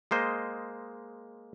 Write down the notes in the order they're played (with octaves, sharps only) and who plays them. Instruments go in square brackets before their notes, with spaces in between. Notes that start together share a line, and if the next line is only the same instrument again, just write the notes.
[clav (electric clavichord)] G#3 A#3 C5 D#5